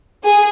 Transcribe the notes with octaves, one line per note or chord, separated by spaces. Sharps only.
G#4